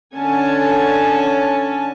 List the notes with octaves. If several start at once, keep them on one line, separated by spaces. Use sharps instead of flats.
D3 C#4 G#5 A5